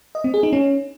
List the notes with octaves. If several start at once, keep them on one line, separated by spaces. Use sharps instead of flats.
D#5
C4
G#4
D#4
C#4